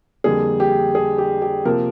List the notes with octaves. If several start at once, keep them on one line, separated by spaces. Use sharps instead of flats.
F2 D3 G3 A#3 G#4
G4
G#4
G4
G4
C3 F3 A#3 A#4